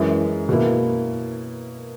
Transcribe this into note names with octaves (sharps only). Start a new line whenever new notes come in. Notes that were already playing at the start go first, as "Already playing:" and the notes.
Already playing: F#2 E3 G#3
B2 A#3 E4